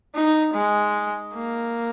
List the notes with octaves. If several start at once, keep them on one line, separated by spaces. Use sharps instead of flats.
D#4
G#3
A#3